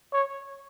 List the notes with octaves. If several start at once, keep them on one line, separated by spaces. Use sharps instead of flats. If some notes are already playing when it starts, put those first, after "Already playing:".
C#5